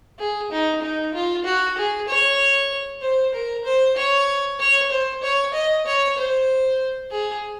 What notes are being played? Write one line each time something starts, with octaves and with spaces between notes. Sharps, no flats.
G#4
D#4
D#4
F4
F#4
G#4
C#5
C5
A#4
C5
C#5
C#5
C5
C#5
D#5
C#5
C5
G#4